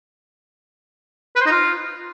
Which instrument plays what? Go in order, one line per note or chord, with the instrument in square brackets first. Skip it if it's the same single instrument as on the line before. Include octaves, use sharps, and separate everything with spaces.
[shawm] B4
C5
D#4
F4